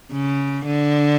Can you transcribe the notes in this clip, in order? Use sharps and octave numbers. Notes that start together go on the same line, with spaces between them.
C#3
D3